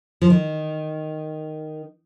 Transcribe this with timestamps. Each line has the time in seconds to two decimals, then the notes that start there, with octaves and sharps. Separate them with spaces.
0.22 F3
0.30 D#3